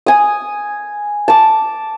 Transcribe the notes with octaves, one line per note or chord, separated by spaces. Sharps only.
G#5 D#6
A5 D6